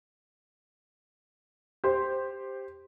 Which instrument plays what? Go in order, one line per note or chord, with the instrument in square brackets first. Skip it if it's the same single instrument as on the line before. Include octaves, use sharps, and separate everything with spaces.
[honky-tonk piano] G4 C5